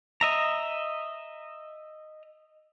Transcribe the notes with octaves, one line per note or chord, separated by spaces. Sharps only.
D#5 E5 A#5